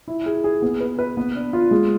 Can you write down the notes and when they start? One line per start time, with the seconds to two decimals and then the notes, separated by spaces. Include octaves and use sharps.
0.08 E4
0.26 G#4
0.44 G#4
0.62 B3
0.81 B4
0.99 B4
1.17 B3
1.35 D4
1.53 F4
1.71 G#3